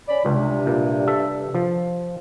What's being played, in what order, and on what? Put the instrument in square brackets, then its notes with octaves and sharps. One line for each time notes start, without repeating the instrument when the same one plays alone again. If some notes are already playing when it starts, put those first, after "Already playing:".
[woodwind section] C#4 D5 B5
[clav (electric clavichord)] C#2 [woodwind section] G2 C3
[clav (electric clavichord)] A#2
A4 E5
F3